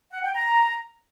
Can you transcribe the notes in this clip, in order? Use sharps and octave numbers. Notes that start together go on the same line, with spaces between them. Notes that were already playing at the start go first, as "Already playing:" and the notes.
F#5
G5
A#5